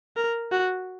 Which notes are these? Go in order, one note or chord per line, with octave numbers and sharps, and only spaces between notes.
A#4
F#4